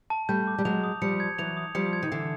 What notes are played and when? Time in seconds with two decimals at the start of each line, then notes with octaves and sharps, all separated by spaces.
0.10 A5
0.29 G3 A3 G6
0.47 D6
0.58 G3
0.65 F#3 G#3 F7
0.84 D#6
1.02 F3 G3 C#7
1.20 G#6
1.38 E3 F#3 F7
1.57 D#6
1.75 F3 G3 C#7
1.93 G#6
2.03 D#3
2.12 D3 E3 C7